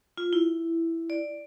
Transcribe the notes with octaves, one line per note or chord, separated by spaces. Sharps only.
F4
E4
D5